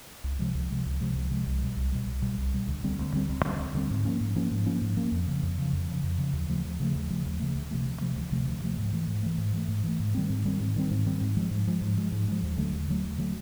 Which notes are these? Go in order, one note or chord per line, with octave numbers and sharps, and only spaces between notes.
C#2
C3 F3 G#3
C#2
C3 F3 G#3
C#2
C3 F3 G#3
C#2
C3 F3 G#3
C2
B2 G3
C2
B2 G3
C2
B2 G3
C2
B2 G3
D2
D3 G3 C4
D2
D3 G3 C4
D2
D3 G3 C4
D2
D3 G3 C4
G#2
F3 A#3 C#4
G#2
F3 A#3 C#4
G#2
F3 A#3 C#4
G#2
F3 A#3 C#4
F2
C#3 F3
F2
C#3 F3
F2
C#3 F3
F2
C#3 F3
D#2
C#3 F3 A3
D#2
C#3 F3 A3
D#2
C#3 F3 A3
D#2
C#3 F3 A3
D2
C3 F3 A3
D2
C3 F3 A3
D2
C3 F3 A3
D2
C3 F3 A3
G#2
E3 A3
G#2
E3 A3
G#2
E3 A3
G#2
E3 A3
G#2
D#3 G3 C4
G#2
D#3 G3 C4
G#2
D#3 G3 C4
G#2
D#3 G3 C4
G#2
F3 G#3
G#2
F3 G#3
G#2
F3 G#3
G#2
F3 G#3
D#2
D3 F#3 A3
D#2
D3 F#3 A3
D#2
D3 F#3 A3